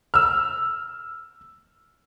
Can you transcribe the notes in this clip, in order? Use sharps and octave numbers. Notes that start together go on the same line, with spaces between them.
E6 F6